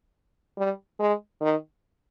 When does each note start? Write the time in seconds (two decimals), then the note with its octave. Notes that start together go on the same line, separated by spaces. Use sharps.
0.57 G3
1.00 G#3
1.41 D#3